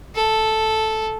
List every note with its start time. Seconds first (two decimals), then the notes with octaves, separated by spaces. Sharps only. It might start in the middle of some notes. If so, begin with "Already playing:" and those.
0.15 A4